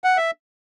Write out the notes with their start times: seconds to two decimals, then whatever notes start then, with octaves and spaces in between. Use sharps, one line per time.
0.04 F#5
0.17 E5